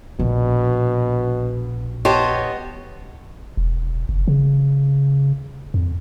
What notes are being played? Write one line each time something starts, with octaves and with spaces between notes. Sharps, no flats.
A#1 B2
B3 G4 C5 C#5 D#5 A5
E1
F#1
C#3
F2